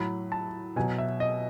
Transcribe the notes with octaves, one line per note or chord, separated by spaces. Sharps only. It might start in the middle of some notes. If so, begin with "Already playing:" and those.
Already playing: A2 F#3 B5
A5
B2 F#3 G#5
E5
D#5